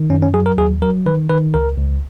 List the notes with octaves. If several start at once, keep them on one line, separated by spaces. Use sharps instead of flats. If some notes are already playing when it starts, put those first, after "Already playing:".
Already playing: D#3
F#2 C#4
C#4
F#3 G#4
A#4
D#2 G#4
F#3 A#4
D#3 B4
D#3 B4
C#2 A#4
C#2